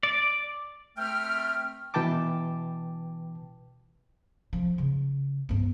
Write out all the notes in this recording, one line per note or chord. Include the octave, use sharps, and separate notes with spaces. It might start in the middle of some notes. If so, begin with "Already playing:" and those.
D5
A3 C4 B4 G5 F6
B2 E3 B4 G5 A5 D6
F3
C#3
G2 B3